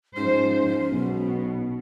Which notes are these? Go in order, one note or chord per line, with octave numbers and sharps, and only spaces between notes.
G#2 F3 C#4 C5
B1 B2